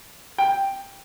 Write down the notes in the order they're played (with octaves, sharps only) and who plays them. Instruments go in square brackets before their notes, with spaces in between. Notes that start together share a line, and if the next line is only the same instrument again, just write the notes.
[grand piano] G5